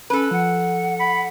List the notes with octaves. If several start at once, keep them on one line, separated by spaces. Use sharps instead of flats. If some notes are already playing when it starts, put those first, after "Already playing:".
C#4 A4 B4
F3 F#5
B5